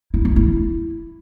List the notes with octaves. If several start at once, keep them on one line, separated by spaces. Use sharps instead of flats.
E4
A3
E4